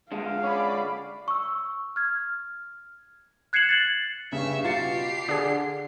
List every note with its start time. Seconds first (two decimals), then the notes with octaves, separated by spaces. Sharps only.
0.12 D3 G#3 F5
0.43 C#4 D5 B5 D6
1.28 C#6 E6
1.96 F6 G#6
3.53 F#6 G#6 C7 C#7 E7 F#7
3.69 A6 C7 F#7
4.33 G2 C#3 E5 C#6
4.64 B2 F4 G4 A6 C7 C#7
5.29 D3 D4 G#4